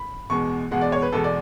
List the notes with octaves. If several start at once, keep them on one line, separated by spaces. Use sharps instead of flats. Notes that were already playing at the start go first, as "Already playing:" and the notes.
Already playing: B5
E2 B2 G#3 C#6
E2 B2 G#3 F#5
D5
C#5
B4
E2 B2 G#3 A4
D5